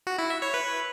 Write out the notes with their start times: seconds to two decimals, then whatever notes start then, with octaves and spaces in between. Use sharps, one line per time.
0.07 F#4
0.19 E4
0.30 E5
0.42 C#5
0.54 B4